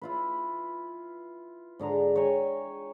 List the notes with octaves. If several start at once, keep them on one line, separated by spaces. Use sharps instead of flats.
E4 F4 B4
G#2 D3 G#4 A#5
C#5 G5 G#5 A#5